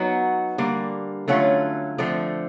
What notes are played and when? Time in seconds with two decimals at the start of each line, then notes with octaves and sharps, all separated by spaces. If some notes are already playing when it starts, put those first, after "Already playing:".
Already playing: F#3 B3 D#4 F#4
0.58 D3 G3 A#3
1.28 D3 F#3 A3 C#4 F4
1.98 D3 F3 A3 C4